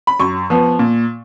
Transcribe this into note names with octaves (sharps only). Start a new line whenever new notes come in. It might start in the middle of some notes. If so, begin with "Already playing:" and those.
B5
F#2 C#6
F3 B3
A#2